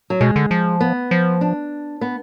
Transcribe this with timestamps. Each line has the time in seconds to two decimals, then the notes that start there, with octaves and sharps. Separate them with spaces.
0.10 F#3
0.21 B2 G#3
0.36 D3
0.51 F3
0.81 B3
1.11 F3
1.41 D4
2.01 B3